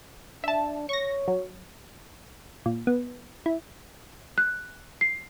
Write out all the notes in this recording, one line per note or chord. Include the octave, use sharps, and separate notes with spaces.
D4 E5 A5
C#5 C#6 A#6
F#3
A#2
B3
E4
F#6
C7